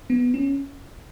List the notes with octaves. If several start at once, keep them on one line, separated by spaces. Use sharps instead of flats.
B3
C#4